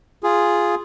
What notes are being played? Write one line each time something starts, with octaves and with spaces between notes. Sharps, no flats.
F4 G#4